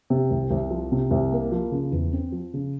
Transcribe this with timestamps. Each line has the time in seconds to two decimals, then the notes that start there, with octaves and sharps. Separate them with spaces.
0.10 C3
0.31 C2
0.50 C2
0.71 F3
0.92 C3
1.11 C2
1.32 A#3
1.51 F3
1.71 C#3
1.92 E2
2.13 C4
2.32 F3
2.54 C#3